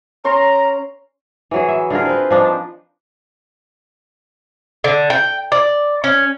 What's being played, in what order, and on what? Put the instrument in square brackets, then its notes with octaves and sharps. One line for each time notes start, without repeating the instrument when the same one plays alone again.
[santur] C#4 C6 [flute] A#5
[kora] E3 F#3 G#4
E5
D3 F4 G#4 A#4
C4 B4
F3 D4 D#4
D4
[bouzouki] D3
G5
D5
C#4